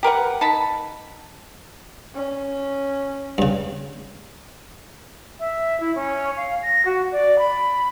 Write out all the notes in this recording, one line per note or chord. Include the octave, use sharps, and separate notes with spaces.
G4 A#4 B4 F#5
D#4 A5 B5
C#4
G2 C#3
E5
E4
C#4
F5
A#6
F#4
D5
B5